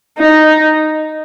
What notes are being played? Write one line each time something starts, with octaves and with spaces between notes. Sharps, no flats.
D#4